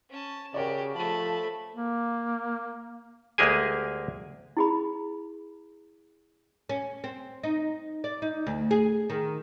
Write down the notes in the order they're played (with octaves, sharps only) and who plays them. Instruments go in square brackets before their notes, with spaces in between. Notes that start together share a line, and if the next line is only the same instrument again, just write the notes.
[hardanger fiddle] C#4 A5
[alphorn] C#3 [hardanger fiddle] F#4 G4 [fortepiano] A#4 C#5 D5
[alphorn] F3 [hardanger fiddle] A3 B5 [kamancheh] A5
[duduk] A#3
[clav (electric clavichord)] D2 G#3 A#3 G4 G#4 G#5
[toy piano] E4 G#4 B5
[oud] C#4
C4
D#4
D5
D#4
D2
G#4
D#3